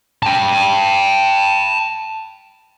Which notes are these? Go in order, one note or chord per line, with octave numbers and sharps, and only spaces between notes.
G5 A5